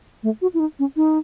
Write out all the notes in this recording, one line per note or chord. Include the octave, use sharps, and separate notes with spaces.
A3
F#4
E4
D#4
C#4
D#4